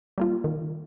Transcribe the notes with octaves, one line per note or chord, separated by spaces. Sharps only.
G3 A#3 F4
D#3